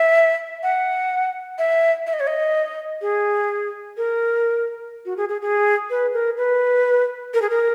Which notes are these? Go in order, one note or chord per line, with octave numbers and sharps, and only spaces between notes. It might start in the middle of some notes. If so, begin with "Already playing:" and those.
Already playing: E5
F#5
E5
E5
D#5
C#5
D#5
G#4
A#4
F#4
G#4
G#4
G#4
B4
A#4
B4
A#4
G#4
A#4